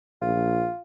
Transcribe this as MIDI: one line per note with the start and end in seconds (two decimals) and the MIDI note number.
0.22 0.68 34
0.22 0.82 65